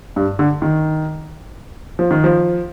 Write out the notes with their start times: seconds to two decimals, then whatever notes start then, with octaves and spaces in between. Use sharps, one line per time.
0.16 G2
0.39 D3
0.62 D#3
1.99 F3
2.11 D#3
2.24 F3